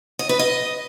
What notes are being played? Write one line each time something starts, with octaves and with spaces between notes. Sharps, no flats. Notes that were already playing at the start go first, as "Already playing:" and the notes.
D#5
B4
D#5